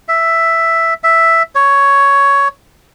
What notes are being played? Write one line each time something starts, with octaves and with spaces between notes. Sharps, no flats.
E5
E5
C#5